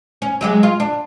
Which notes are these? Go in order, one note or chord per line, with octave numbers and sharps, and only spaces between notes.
C#4
F#3 G#3 G4
F4
D4